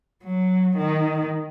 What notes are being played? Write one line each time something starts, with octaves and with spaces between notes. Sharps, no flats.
F#3
D#3